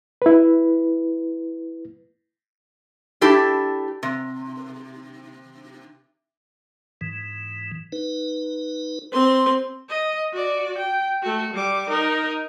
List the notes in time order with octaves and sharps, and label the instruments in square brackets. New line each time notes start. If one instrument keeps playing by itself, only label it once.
[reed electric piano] E4 B4
[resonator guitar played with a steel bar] D4 E4 G4 A4
C3
[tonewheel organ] G#2 E3
D#4 B4
[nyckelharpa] C4 C6
[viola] D#5
F#4 D5
G5
A3 F#4
G3 D6
D#4 A#4